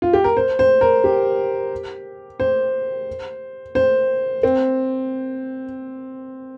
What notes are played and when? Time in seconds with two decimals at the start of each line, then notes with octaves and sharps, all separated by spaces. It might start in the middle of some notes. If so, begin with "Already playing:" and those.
0.02 F4
0.13 G4
0.24 A#4
0.37 C5
0.59 C5
0.81 A#4
1.04 G4
2.40 C5
3.75 C5
4.43 C4